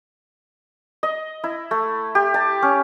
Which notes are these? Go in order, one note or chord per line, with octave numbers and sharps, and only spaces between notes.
D#5
E4
A3
G4
A5
C#4